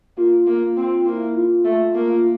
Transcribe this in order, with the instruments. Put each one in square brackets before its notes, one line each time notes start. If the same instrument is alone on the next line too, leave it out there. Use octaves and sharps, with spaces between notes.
[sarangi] A#3 [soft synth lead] F4
[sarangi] A#3
C4
[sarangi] A#3 [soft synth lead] E4
[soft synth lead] F4
[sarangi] A3
A#3